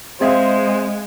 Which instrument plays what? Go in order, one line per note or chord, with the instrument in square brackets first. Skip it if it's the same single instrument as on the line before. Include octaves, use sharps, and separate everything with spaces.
[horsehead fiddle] G#3 [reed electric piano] C4 [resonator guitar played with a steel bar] G#4 E5 F5 [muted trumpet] C5